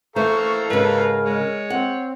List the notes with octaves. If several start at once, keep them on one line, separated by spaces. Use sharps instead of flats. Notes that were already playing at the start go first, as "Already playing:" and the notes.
E3 A3 A4 C5 F5 A#5 C#6
G#2 C#3 A#4 B4
G#3 C#5
C4 F#5